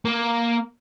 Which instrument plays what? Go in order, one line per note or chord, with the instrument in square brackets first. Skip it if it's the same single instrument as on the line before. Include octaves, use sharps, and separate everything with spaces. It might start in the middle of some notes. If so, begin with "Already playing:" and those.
[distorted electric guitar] A#3